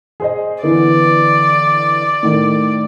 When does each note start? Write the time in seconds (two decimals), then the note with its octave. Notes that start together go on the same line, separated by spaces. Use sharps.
0.20 G#4 C5 D#5
0.63 D3 E3 B3 D5
2.23 A2 D#3